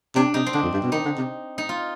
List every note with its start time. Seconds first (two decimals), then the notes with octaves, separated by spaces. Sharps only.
0.16 C3 D4
0.34 C3 D#4
0.46 C4
0.53 D3 D4
0.63 F2
0.73 G2
0.83 B2
0.92 D#3 D#4
1.05 D3
1.18 C3
1.58 D#4
1.69 F4